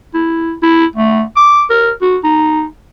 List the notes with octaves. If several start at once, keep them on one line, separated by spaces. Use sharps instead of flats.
E4
E4
A3
D6
A#4
F#4
D#4